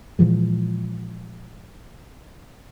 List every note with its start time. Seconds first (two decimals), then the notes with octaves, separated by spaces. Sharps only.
0.19 A#2 E3 F3 G#3